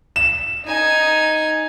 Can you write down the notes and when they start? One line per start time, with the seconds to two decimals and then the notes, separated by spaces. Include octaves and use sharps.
0.16 E7
0.65 D#4 G#5